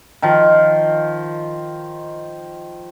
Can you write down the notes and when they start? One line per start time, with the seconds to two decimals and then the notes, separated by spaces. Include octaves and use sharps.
0.22 D#3 F3